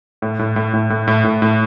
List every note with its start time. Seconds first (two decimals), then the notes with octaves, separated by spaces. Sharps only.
0.22 A2
0.39 A2
0.56 A2
0.74 A2
0.90 A2
1.08 A2
1.24 A2
1.42 A2